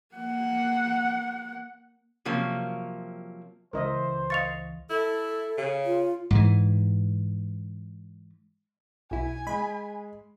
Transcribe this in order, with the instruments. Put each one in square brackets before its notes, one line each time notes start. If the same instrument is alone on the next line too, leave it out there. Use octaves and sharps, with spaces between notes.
[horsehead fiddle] A#3 F#5
[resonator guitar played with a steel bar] C3 F3 F#3 A#3 C#4
[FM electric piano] C#2 E3 [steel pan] A#4 D#5 E5 [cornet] C5
[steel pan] D#5 F5 C#6 [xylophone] A6 C#7 F7
[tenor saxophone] E4 [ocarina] A4
[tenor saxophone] C#3
[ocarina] F4
[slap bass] G#2 E3
[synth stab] B1 E4 [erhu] G#5
[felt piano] G#3 [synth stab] B5